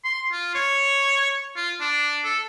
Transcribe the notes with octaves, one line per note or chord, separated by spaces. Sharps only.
C6
F4
C#5
F4
D4
A4